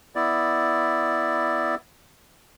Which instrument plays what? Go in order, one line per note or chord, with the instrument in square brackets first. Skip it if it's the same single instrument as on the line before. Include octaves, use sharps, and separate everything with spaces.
[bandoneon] B3 E4 D5